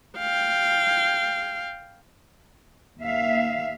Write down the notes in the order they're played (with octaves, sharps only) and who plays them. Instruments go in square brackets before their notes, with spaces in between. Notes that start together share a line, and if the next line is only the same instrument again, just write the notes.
[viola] F5 G5
[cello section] D#2 A#3 E5 F5